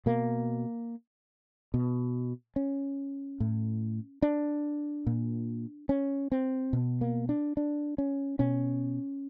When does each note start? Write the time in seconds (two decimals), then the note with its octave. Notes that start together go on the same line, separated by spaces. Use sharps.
0.06 B2 A#3
1.74 B2
2.56 C#4
3.40 A2
4.22 D4
5.07 A#2
5.89 C#4
6.32 C4
6.73 B2
7.01 A#3
7.29 D4
7.57 D4
7.98 C#4
8.39 B2 C#4